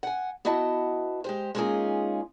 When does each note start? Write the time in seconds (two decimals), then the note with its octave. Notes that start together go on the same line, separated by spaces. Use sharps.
0.03 F#5 G#5
0.45 B3 E4 F#4 D#5 E5 A5
1.24 G#3 G4 C5
1.55 G#3 A#3 C#4 D#4 F4 G#4